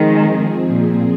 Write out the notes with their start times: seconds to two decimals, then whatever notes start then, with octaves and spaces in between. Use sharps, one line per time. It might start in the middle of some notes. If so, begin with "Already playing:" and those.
Already playing: D#3 F3 G#3 C4 G#4
0.67 A#2